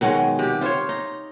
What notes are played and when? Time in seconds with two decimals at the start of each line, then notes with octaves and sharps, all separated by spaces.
0.01 B2 D#3 F#3 G#3
0.39 C3 G4
0.61 F4 C5 C#5
0.89 D#4